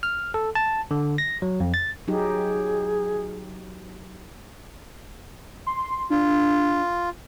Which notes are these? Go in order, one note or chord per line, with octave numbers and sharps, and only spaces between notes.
F6
A4
A5
D3
A#6
F#3
F2
A6
F#3 D#4 G4 G#4
C6
D4 F4